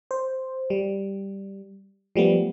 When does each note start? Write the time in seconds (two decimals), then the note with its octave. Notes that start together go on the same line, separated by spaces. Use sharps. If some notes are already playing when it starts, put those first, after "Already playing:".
0.11 C5
0.70 G3
2.16 F3 G3 A3 B3